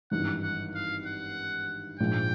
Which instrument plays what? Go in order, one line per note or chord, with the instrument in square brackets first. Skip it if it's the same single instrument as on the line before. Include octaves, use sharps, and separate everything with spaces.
[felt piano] G#1 G2 E3 [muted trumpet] F#5
[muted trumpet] F#5
F5
F#5
[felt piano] A#1 G#2 F3 G#3 [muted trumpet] G5